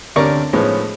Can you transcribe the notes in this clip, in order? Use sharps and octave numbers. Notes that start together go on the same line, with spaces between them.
D2 C3 C#4 A#4 D5 C#6
A2 F3 G#3 B3 C#4 D#4